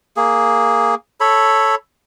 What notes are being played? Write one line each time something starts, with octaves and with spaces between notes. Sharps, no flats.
A#3 G#4
A4 C#5 B5